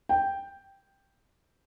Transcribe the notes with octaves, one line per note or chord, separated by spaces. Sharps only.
G5